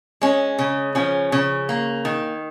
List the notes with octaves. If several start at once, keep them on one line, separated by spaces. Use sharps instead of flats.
G#3 C#4
C#3
F3 C#4
C#3
A#3
D#3